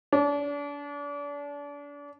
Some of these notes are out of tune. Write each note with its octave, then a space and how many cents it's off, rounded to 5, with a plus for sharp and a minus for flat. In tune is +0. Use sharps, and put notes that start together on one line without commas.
D4 -35